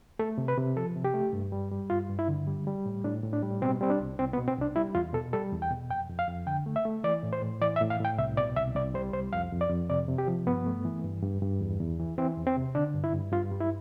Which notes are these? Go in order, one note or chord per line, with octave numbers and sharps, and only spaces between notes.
A3 A4
C3
B4
C3
F3 A4
C3
G4
A3
G2
G3
G3
G2 F4
G2
E4
D3
G3
G3
A2
A2 D4
A2
D4
G3
B2 C4
G3 C4
D4
C2
C2 C4
B3
B2
C4
C2 D4
G3 E4
E2 F4
B2 A4
G3 A4
E2
G5
B2
F2 G5
F2
F5
F2
D3 G5
A3
E5
A3
E3 D5
A2
C5
A2
E3 D5
E5
A2
F5
A2 G5
C2 E5
B2 D5
C2 E5
C2 D5
G3 C5
C2 C5
F2 F5
F2
D5
F2
C3 D5
C3
G4
F3
G2 B3
A3
E3
G2
G2
G2
E2
E2
E3
E3 C4
E2
C4
C3
D3 D4
G2
E4
G2
G2 F4
G3
E4